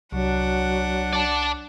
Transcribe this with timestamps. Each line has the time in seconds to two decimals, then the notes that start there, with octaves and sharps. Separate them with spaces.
0.12 C2 F#3 D4 F#5
1.13 D5 A5